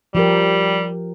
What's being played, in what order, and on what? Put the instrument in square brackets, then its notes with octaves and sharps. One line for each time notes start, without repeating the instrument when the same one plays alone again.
[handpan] F3 G4 A#4 [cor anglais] G3